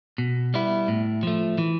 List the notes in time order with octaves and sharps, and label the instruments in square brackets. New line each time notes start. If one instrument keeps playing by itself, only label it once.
[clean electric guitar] B2
G3 B3 E4
A2
F3 A3
E3